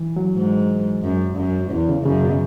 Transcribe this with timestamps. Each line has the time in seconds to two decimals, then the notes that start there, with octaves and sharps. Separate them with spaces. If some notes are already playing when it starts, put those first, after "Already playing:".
Already playing: E3
0.16 F#3
0.35 G#2
1.03 F#2
1.37 F#2
1.71 E2
1.89 C#3
2.05 F#2 C#3
2.23 B2